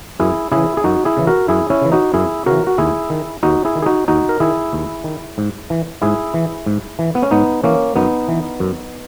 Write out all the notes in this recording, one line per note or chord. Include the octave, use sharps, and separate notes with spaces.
F#2 E4 G#4
C#3 E3 E4 G#4
G#4
F#2 D#4 F#4
E4 G#4
C#3 E3
F#4 A#4
F#2 E4 G#4
C#4 E4
C#3 E3
D#4 F#4
F#2 E4 G#4
C#3 E3 F#4 A#4
F#4
D#2 E4 G#4
D#3
D#2 D#4 F#4
E4 G#4
D#3
G#4
D#4 F#4
D#2 D#4 F#4
A#4
D#3 E4 G#4
D#2
D#3
G#2
E3
G#2 E4 G#4
E3
G#2
E3
B3
C#4
G#2 B3 D#4
E3 A#3 C#4
F#2 B3 D#4
E3
F#2